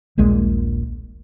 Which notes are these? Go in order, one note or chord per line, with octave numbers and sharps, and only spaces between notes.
D#1 A#1 A#2 G#3